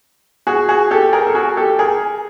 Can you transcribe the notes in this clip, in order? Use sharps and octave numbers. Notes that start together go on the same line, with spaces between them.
F#4 G#4
F#4 G#4
G4 A4
G#4 A#4
A4
F#4 G#4
G4 A4
G#4 A#4